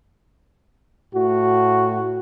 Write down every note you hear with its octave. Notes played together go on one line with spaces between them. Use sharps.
A2 F#4